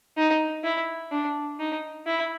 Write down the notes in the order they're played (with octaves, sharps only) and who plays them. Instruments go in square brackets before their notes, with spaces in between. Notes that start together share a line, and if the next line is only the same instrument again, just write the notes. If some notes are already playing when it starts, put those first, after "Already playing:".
[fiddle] D#4
E4
D4
D#4
E4